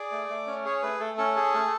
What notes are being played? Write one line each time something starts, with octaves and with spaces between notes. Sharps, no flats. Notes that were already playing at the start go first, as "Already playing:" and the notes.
Already playing: G#4 D5
A3
A3
C#4
G#4 C#5
A3 B4
A3 A4
C#4 A4
G#4
A3